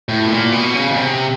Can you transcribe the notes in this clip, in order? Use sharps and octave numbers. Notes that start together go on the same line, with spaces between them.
A2
B2
A#2
B2
C#3
B2
C3